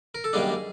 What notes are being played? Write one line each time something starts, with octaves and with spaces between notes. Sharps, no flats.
A#4
A4
F#2 D#3 G3 A#3 D4 G#4